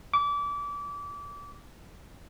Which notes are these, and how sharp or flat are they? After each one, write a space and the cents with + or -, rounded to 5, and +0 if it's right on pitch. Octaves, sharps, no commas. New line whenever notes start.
D6 -30